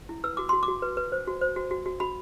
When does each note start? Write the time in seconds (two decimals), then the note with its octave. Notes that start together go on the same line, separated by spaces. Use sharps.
0.09 E4
0.24 B4 E6
0.37 F#4 D6
0.49 F#4 C6
0.63 D6
0.68 F#4
0.82 B4
0.97 B4
1.12 C5
1.27 F#4
1.41 C5
1.56 F#4
1.71 F#4
1.86 F#4
2.00 F#4 B5